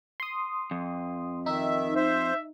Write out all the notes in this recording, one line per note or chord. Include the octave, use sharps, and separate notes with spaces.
C6 D#6
F2
D#3 D#4 E5
C5 E5